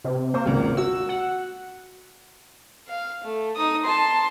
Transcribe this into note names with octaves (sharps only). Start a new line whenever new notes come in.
C3
A#3 C5
G#1 C#2
F#4 E6
F#5
F5
A3
D#4 D#6
A5 C6